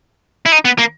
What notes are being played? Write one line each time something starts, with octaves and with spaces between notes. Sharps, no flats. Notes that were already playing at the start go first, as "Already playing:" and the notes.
E4
D#4
B3
A#3